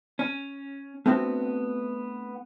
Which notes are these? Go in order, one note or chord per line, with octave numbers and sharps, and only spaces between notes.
C#4
A3 B3 C4 D4 F#4